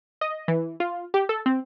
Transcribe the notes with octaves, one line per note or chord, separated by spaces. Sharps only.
D#5
E3
F4
G4
A4
C4